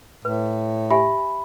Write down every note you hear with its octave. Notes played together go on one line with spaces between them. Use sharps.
A2 B4
G4 E5 G#5 B5